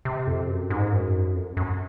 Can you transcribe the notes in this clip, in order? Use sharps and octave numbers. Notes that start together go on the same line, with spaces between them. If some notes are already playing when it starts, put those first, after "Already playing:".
C3
F2
F#2
G#2
F#2
F2
F#2
F#2